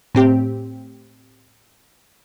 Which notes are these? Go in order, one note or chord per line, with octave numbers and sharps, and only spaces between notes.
A2 C4 G4